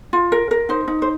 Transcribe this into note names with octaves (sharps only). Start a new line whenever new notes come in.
F4
A#4
A#4
D#4 C5
D#4
C5